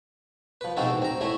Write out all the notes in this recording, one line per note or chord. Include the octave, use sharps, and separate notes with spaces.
F3 B4
B2 G#3 C4 D#4 F#4 A4
A1
C4 A#5
A3 C#4 E4